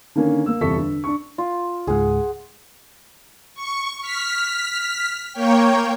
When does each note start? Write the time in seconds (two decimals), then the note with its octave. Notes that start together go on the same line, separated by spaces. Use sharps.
0.15 D3 D#3 A#3 C#4
0.46 A#3 E6
0.61 G1 E2 C3 A4 C#6 B6
0.77 D3
1.04 D4 C#6
1.38 F4
1.87 C#2 G#2 G#4 F#5
3.54 C#6
4.01 F6 B6
5.33 A#3 C#5 G5